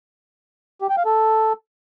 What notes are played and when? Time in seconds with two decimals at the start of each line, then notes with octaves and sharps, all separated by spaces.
0.81 G4
0.89 G5
0.97 F5
1.05 A4